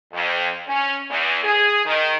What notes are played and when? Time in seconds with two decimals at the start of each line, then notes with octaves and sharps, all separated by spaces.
0.12 F2
0.66 C#4
1.08 E2
1.42 G#4
1.84 D#3